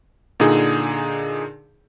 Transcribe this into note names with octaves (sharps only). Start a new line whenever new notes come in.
A#2 D3 D#4 G#4